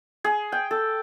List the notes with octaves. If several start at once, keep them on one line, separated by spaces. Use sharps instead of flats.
G#4
G5
A4